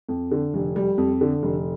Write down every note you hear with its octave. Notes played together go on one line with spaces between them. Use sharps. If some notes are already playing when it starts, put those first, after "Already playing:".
F2
D3
F1
G3
F2
D3
F1